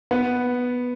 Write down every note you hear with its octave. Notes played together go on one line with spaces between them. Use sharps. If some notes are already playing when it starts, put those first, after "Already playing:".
B3